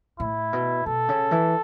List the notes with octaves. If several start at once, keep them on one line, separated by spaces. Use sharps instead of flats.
A2 E4
B2
B2 A4
C#3
E3